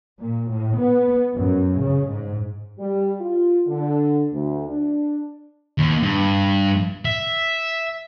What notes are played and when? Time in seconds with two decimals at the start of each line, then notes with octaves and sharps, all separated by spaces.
0.20 A#2
0.50 A2
0.78 B3
1.36 F#2
1.78 C#3
2.10 G#2
2.79 G3
3.20 F4
3.67 D3
4.32 D2
4.68 D4
5.78 D#2
6.03 G2
7.05 E5